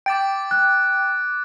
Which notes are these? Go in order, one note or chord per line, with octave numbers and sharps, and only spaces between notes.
G5 D6 A6 D7
F#6